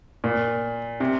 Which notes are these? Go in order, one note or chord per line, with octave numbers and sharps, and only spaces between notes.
A#2
C3